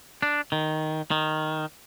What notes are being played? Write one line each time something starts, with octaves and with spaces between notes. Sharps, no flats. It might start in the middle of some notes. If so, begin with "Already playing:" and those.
D4
D#3
D#3